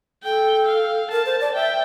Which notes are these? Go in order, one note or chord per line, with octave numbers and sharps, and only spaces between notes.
A4 G5
F5
A#4 A5
C5
D5
E5 G5